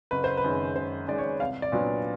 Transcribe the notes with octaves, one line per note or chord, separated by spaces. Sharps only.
F#1 B4
C5
B4
F#2 D#3 G#3
F#1 C5
F#2 D#3 G#3 D5
C#5
C2 F5
D5
A#2 F#3 B3 D4